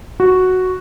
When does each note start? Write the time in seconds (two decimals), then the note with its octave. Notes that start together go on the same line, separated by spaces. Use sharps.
0.20 F#4